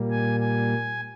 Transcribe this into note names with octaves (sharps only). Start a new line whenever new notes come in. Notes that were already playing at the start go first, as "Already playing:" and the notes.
Already playing: A#2 G3 A#3
G#5
G#5